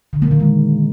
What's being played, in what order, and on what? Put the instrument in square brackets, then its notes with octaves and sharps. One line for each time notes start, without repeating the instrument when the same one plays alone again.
[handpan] D3
A#3
D#3
G#3